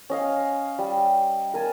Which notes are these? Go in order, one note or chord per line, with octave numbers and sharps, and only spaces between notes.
C#4 D#5 F5
G3
A#4 G#5 A5